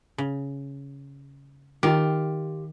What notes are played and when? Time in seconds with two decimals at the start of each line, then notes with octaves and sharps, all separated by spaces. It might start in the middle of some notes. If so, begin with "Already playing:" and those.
0.18 C#3
1.83 D#3 F4 G4